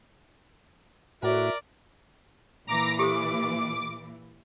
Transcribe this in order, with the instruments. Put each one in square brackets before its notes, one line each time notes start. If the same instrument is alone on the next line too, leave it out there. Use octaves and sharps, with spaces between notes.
[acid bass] A2 [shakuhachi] F#4 [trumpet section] A#4 D5 [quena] E5
[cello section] A#2 E3 [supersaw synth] A#5 D6 A#6
[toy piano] G4 A4 C5 [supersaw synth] D6